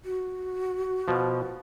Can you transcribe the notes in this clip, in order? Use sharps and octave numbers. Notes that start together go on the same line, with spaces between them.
F#4
B2 F3